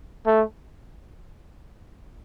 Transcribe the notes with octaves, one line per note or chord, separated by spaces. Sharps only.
A3